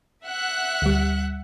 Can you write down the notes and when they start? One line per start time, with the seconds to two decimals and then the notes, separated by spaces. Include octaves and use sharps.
0.25 E5 F#5 F#6
0.82 D2 G3